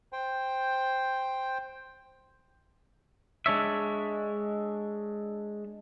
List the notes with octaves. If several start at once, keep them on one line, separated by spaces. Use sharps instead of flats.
C5 G5
G#3 D4 C#5 E5